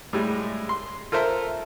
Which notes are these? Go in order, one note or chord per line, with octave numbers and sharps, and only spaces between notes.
A2 G3 G#3
C6
F4 A4 A#4 C5 E5